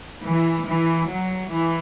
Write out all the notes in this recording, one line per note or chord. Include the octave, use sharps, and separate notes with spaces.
E3
E3
F#3
E3